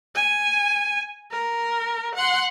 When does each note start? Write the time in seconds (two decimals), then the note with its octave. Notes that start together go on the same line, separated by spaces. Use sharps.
0.15 G#5
1.32 A#4
2.15 F#5 C6